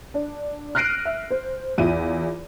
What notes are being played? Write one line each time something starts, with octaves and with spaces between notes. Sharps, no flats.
D4
F6 F#6 A#6 C7 D7 D#7
E5
C5
E2 F4 E5 D#7